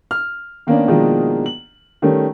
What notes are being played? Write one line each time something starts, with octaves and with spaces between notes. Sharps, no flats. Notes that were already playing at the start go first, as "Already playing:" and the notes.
F6
D#3 A#3 B3 C#4 D4
B2 D#3 F3 G#3 A#3 D4
F#7
D#3 G3 A3 C#4